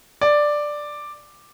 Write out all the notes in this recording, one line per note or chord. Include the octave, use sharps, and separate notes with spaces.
D5